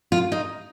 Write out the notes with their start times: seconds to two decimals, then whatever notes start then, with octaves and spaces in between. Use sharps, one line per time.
0.12 F4
0.32 D#4